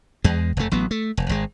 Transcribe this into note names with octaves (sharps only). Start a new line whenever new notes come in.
E2 G#3
F1 A3
A1 F#3 B3
A3
F1
G#1 G#3